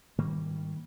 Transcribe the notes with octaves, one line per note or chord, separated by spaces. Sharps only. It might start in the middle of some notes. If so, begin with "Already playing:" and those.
G#2 D#3 G3 A#3